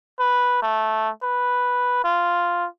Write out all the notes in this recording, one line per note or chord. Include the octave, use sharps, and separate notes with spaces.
B4
A3
B4
F4